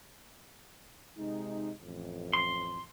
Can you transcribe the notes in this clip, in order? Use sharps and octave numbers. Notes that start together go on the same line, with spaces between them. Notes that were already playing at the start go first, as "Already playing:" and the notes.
C3 G#3 D#4
A1 F2
C6